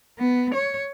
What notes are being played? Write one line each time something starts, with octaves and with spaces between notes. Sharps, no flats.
B3
C#5